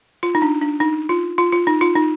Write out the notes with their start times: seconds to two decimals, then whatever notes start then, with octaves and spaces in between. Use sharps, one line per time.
0.23 F4
0.35 D#4
0.42 D4
0.61 D4
0.80 D#4
1.09 F4
1.38 F4
1.52 F4
1.67 D#4
1.81 F4
1.95 D#4